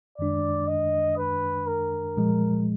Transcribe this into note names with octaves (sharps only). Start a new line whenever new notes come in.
F#2 D#3 G#3 D4 D5
D#5
B4
A#4
A#2 F3 G#3